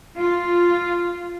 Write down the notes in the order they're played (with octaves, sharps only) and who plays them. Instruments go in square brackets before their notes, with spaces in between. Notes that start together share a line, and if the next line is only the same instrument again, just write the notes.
[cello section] F4